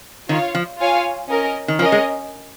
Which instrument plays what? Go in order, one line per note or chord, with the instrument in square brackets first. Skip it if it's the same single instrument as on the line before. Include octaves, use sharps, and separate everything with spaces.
[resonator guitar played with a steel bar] D#3 [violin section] F4 C#5 F5
[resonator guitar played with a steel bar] F3
[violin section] F4 C#5 F5 G#5
C#4 A#4 D#5
[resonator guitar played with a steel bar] D#3
[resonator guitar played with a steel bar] F3 [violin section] C#4 A#4 D#5
[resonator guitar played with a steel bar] G#3